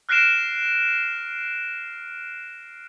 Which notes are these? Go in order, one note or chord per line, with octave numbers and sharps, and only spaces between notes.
F6 F#6 A#6 C7 D7 E7